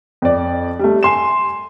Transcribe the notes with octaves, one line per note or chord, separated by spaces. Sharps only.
F2 D5
G3 A3
G#5 C6 E7